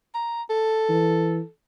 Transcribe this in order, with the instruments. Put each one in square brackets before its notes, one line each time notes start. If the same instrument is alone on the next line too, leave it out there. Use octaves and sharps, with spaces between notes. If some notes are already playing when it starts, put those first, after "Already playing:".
[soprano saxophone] A#5
A4
[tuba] E3